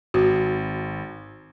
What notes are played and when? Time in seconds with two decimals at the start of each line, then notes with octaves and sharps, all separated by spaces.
0.14 G#1 F#4